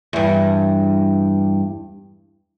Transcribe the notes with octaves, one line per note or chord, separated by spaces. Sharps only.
E2 G2